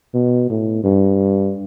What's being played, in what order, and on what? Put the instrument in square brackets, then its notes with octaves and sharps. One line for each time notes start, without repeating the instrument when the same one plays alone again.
[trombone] B2
A2
G2